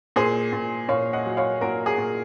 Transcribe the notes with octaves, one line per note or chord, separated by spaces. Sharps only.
A#2 G#4 C5
A#2
A#2 C#5 F5
D#5 F#5
F#3
C#5 F5
A#2 F#4 A#4
G#4
A#2